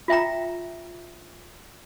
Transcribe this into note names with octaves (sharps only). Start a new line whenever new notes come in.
F4 E5 G5 A#5